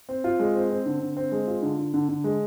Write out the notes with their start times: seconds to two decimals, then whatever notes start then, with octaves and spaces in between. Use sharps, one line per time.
0.09 C4
0.24 F4
0.40 G#3
0.55 C4
0.70 C4
0.86 D3
1.01 D3
1.17 C4
1.32 G#3
1.47 F4
1.62 D3
1.78 D3
1.94 D3
2.09 D3
2.24 G#3